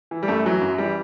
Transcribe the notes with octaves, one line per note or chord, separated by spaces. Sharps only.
E3
G3
F#2 A3
E3 F#3
F#2
E3 G3